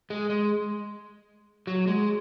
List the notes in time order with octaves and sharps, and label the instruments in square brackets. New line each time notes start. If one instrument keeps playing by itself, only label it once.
[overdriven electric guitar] G#3
G#3
F#3
G#3